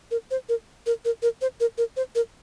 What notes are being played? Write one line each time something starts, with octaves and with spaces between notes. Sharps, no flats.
A#4
C5
A#4
A#4
A#4
A#4
C5
A#4
A#4
C5
A#4